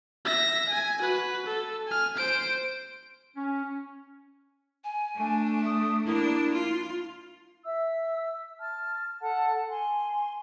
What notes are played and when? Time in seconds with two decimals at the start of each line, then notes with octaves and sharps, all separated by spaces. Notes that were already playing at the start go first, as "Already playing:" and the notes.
0.25 E5 A#6
0.69 G#5
1.01 F#4 B4
1.46 A4
1.87 G#5 F6
2.16 C5 D7
3.36 C#4
4.84 G#5
5.15 A3 D4
5.65 D#6
6.06 A#3 D4 E4
6.53 F4
7.64 E5 E6
8.60 A5 F6
9.21 A4 F#5 A5
9.69 G#5 C6